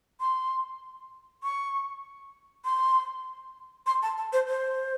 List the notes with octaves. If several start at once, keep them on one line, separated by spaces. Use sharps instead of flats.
C6
C#6
C6
C6
A5
A5
C5
C5